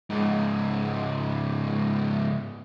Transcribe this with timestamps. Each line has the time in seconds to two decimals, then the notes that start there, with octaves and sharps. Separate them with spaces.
0.10 C#2 G#2